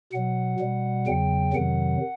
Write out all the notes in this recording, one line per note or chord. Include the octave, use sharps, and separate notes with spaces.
B2 F#3 F#5
B2 G3
E2 C#3 F#3 G5
F2 C3 D#3 F#3 F#5